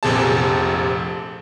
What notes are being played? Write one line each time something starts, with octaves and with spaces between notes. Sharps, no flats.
F1 A#1 C3 G#4 A5